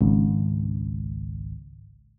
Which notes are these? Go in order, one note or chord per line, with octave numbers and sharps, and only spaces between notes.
G#1 C#2